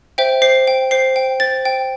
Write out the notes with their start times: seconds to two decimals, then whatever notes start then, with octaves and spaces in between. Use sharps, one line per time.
0.18 C5 E5 G5
0.42 C5 C7
0.67 G5
0.91 C5 C7
1.16 G5
1.40 C5 A6
1.65 G5